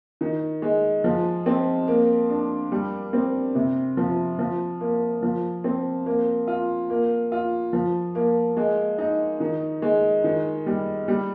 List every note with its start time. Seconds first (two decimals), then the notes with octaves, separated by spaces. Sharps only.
0.21 D#3
0.62 G#3
1.04 F3
1.46 C4
1.88 A#3
2.29 D4
2.72 G3
3.13 C4
3.55 C3
3.97 F3
4.39 F3
4.81 A#3
5.22 F3
5.64 C4
6.06 A#3
6.47 F4
6.90 A#3
7.32 F4
7.73 F3
8.15 A#3
8.57 G#3
8.98 D#4
9.40 D#3
9.82 G#3
10.24 D#3
10.66 G3
11.08 G3